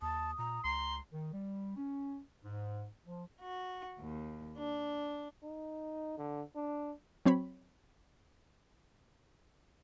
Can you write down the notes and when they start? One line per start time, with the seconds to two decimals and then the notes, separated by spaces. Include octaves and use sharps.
0.02 D#2 A5 D#6
0.38 A#2 A#5
0.64 C#2 A#5 C6
1.13 D#3
1.32 G3
1.76 C#4
2.44 G#2
3.06 F3
3.41 F#4
3.99 D#2
4.58 D4
5.43 D#4
6.18 D3
6.56 D4
7.25 F#3 C4 C#5 B5